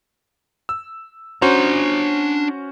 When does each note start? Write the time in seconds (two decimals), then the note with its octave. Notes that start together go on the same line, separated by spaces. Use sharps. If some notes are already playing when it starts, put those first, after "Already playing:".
0.69 E6
1.42 C#4 D4 F#4 C5 A#5